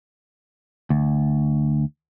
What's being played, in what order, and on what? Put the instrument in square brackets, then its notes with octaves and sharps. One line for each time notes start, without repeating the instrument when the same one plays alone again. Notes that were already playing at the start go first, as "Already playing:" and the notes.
[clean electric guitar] D2